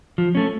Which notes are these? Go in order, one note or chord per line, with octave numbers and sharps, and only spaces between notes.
F3
A3 C#4